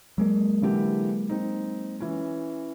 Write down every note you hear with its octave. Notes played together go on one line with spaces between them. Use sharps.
F#3 G#3 A#3
D3 E3 G4
C4 D#4
E3 C#4